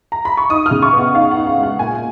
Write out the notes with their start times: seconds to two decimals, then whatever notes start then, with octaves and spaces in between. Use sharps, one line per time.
0.12 A#5
0.25 B5
0.37 C#6
0.49 D#4 D#6
0.66 F6
0.71 C#3
0.82 C#6
0.93 B3
0.98 F#5
1.14 D#4 F5
1.31 F#5
1.37 D#4
1.47 F#5
1.58 G#3
1.63 F#5
1.79 A#2 G#5